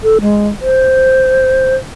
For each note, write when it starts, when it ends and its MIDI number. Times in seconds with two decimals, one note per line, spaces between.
0.03 0.18 69
0.21 0.49 56
0.61 1.76 72